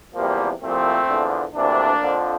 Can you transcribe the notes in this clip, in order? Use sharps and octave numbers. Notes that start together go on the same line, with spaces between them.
E2 C3 F3 G3 A#3
C2 A#2 F3 A3 C4
E2 D3 F3
D2 C3 E3 A#3 D4
F2 D3 F3